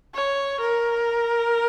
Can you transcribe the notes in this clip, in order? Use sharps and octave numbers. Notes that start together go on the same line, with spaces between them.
C#5
A#4